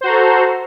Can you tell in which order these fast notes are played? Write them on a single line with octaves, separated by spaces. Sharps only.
C5 F#4 A#5 A4